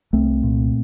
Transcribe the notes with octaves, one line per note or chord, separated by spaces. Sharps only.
C2 A3 C4
A#2